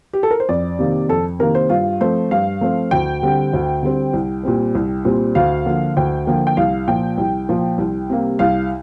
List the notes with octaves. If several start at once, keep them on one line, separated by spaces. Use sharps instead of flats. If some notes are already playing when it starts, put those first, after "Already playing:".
G4
A4
A#4
C5
F2 D5
C3 D#3 A#3
F2 A4
C3 D#3 A#3 A#4
C5
G2 F4
F3 A3 C4 C5
G2 F5
F3 A3 C4
D2 G5
D3 G3 C4
D2
D3 G3 C4
C2
A#2 G3 C4
C2
A#2 G3 C4
D2 F5
D3 F3 A#3
D2 G5
D3 F3 A#3
G5
C2 F5
A#2 F3 G5
C2
A#2 F3
C2
C3 G3 A#3
C2 F5